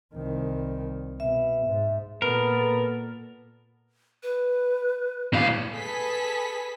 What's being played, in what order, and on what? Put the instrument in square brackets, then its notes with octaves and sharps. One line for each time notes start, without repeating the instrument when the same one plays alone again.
[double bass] C2 D#3
[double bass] B2 [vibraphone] E5
[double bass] G#2
[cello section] A#2 A4 [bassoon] B3 [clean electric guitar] A#4
[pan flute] B4
[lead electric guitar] A2 F5
[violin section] G#4 A4 B4 B6